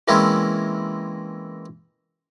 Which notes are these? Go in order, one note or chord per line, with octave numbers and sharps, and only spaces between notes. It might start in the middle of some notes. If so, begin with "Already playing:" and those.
E3 G#3 A#3 C4 C#4 E4